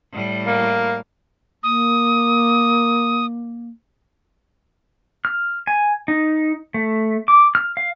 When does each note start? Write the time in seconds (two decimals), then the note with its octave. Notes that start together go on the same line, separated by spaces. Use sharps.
0.13 A2 G3
0.46 A#3
1.63 A#3 D#6
5.25 F6
5.67 G#5
6.08 D#4
6.74 A3
7.28 D6
7.55 F6
7.77 F5